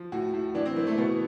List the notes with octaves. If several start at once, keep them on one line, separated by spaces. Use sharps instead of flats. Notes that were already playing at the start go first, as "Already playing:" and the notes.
Already playing: F3
A2 F#4
A2
E3 D4
C4
E3 A#3
A3
B2 B3